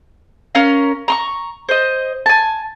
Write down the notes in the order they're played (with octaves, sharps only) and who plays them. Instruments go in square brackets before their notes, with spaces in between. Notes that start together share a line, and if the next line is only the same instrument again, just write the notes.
[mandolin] C#4 A#4 F5
A#5 C6 C#6
C5 D#5
G#5 A5